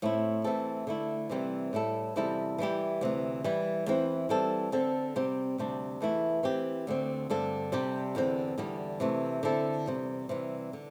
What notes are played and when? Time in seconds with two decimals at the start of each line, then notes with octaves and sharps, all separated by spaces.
0.02 A2 A3 C4 E4
0.44 E3 A3 C4 A4
0.87 D3 A3 E4
1.30 C3 E3 G3 C4
1.73 A2 G3 E4 A4
2.16 E2 C3 G3 E4 A4
2.58 E3 G3 E4 G4
3.01 D2 C3 E3
3.44 E3 G3 E4
3.86 E2 E3 C4 E4
4.29 E3 G3 C4 A4
4.72 D3 C4 A4
5.16 C3 G3 C4 G4
5.58 D2 C3 G3 D4
6.01 E2 E3 A3 E4
6.43 E3 C4 G4
6.87 D2 D3 C4
7.30 G2 D3 C4 A4
7.72 C3 G3 D4 G4
8.15 E2 D3 C4
8.58 E2 D3 G3
9.00 C3 E3 A3
9.43 D3 C4 E4 A4
9.86 E2 C3 G3
10.29 C3 E3 G3
10.73 D3